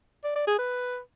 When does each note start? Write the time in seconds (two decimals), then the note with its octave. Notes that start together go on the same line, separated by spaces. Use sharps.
0.24 D5
0.35 D5
0.47 G#4
0.59 B4